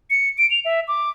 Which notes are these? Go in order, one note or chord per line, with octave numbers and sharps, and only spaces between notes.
C#7
D7
F7
E5
D6